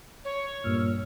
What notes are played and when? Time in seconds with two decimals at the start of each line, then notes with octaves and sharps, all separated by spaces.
0.25 C#5
0.64 G2 A#2 E6 F6